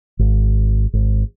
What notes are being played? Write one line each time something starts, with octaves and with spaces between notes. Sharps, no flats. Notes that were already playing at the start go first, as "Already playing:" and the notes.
G#1
G#1